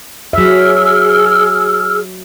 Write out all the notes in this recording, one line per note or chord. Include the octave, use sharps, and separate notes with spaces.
F#3 G#4 E5 E6 F6